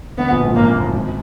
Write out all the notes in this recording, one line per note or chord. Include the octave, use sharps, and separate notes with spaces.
D2 D3 B3
A#1 A#2
G#1 G#2
A#2
G#1 G#2 A#3
F#2
G#1 G#2
G#1 G#2